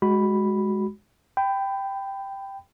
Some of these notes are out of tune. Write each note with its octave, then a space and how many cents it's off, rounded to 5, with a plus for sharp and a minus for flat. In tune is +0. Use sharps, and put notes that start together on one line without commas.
G#3 +0 F#4 +10 B5 +0
G5 +0 B5 +25